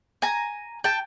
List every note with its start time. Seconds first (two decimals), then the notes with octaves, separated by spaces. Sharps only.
0.22 G#5 A#5
0.84 G5 A5